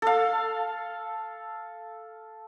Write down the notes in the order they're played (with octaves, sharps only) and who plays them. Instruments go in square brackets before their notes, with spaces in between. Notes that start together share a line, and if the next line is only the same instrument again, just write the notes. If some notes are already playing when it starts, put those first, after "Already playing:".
[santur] A4 F5